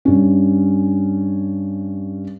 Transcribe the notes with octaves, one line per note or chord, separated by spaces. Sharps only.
G2 C#4